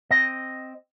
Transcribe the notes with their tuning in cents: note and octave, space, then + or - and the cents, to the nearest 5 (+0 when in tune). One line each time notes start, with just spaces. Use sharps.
C4 +0 D#5 +0